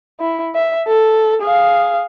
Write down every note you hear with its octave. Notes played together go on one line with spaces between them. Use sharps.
E4
E5
A4
G#4 F5